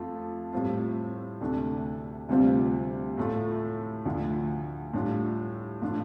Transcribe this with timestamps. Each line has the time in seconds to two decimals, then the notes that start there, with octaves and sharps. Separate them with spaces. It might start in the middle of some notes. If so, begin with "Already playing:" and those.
Already playing: F2 F3 A3 F4
0.53 A2 G3 C4 F4
1.41 D2 C3 A3 D4
2.29 D2 C3 G3 C4 F4
3.17 A2 A3 F4
4.05 D2 D3 F3
4.94 A2 G3 D4 F4
5.82 A2 F3 D4 F4